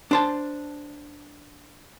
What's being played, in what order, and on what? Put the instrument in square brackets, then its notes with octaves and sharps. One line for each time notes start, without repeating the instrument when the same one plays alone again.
[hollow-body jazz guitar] D4 C5 A5